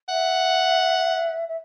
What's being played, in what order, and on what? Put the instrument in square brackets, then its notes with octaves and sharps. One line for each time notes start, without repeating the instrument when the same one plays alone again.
[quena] E5 [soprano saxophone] F#5
[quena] E5